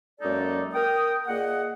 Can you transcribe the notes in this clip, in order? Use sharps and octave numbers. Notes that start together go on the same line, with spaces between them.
F#2 G#3 A#3 D#4 A4 D5
A#4 G5 D#6
A#2 A#3 G#4 D#5 F#5